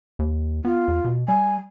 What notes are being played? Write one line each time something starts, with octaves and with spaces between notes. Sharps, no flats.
D#2
B3 F4
E2
B2
G3 G#5